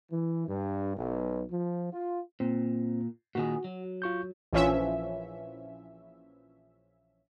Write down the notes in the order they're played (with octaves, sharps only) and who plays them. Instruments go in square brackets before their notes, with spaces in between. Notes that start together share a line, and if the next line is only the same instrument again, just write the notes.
[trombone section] E3
G2
B1
F3
F4
[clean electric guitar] A#2 [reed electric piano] C4
[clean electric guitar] A#2 D#3 G#4 [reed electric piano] F#4
[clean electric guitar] F#3
[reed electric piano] F4 C#6 G6
[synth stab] A#1 E3 F3 C#4 E5